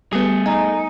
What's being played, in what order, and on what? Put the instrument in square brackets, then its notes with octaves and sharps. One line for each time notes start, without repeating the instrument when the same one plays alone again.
[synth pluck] G3 B3 [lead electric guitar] A3 G#4
[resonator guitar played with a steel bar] D#4 [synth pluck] G#5